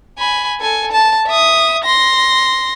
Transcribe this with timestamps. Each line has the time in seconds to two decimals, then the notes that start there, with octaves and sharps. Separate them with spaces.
0.18 G#5 B5
0.60 A4 G#5
0.91 A5
1.27 E5 D#6
1.84 C6 A#6